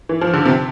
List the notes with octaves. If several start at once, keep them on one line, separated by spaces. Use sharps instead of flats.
E3
F3
D3
C3